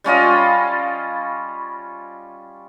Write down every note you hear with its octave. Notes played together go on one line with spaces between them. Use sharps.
G3 C#4 F4 D#5